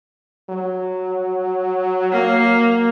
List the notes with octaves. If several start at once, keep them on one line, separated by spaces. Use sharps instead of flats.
F#3
A#3